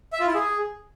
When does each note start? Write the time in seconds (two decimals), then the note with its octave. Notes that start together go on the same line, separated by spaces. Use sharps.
0.13 E5
0.20 F4
0.27 E4
0.35 G#4